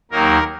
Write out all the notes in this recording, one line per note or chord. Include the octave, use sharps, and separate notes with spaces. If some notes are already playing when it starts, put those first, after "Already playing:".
D#2 D#3 F#3 A#3 A#4